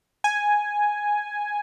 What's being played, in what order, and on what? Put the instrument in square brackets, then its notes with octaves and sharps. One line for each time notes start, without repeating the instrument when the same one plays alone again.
[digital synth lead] G#5